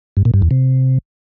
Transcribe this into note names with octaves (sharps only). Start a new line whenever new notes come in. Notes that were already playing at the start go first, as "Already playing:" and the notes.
G2
A#2
G2
E2
C3